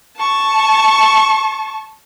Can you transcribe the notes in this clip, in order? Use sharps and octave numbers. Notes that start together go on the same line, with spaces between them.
A5 C#6